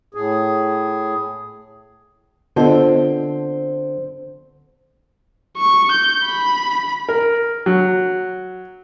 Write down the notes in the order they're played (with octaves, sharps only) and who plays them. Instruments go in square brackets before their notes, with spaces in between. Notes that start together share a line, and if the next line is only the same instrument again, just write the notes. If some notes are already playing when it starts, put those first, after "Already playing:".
[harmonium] A2 G#4
[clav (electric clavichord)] D3 [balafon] B3 F4 D#5 [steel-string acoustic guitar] C4 C5
[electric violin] C#6
G6
B5
[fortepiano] A#4
F#3